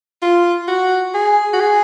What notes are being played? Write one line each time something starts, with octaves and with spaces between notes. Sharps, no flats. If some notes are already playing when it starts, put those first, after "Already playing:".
F4
F#4
G#4
F#4
G#4